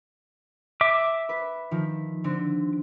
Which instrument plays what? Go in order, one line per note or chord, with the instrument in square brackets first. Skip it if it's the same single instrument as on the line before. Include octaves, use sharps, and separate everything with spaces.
[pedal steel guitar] E5 D6
[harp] B4
D#3 F3
D3 C4